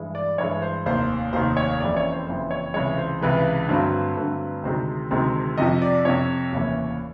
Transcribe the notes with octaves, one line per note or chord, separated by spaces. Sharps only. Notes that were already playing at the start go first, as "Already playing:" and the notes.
Already playing: G2 E3 G#3
D5
G2 E3 G#3 C#5
C5
F1 D#2 D#3 C5
F1 D#2 D#3 C5
C#5
F#1 F2 C#3 E3 D5
C#5
C5
F#1 F2 C#3 E3 C5
C#5
C#2 C3 E3 G#3 C#5
C5
C#2 C3 E3 G#3 B4
G2 D3 F#3 A3 C4
G2 D3 F#3 A3 C4
D2 C3 D#3 G#3 C4 C5
D2 C3 D#3 G#3 C4
F2 C3 F3 D#5
D5
F2 C3 F3 C#5
F1 D#2 C#3 E3